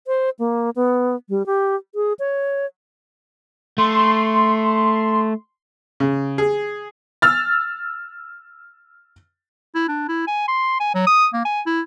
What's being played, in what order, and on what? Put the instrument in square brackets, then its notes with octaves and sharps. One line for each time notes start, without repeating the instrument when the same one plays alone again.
[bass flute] C5
A#3
B3
G3
G4
G#4
C#5
[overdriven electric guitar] A3 [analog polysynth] C6
[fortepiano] C#3
G#4
[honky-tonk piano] E6 F6 A6
[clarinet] E4
D4
E4
G#5
C6
G#5
F#3
D#6
A#3
G#5
E4